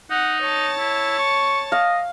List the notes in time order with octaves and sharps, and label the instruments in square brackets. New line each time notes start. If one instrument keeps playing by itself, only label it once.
[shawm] D#4 [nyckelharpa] F#5
[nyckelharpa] C#5 A5
[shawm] E4
C#6
[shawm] D#5 [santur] F5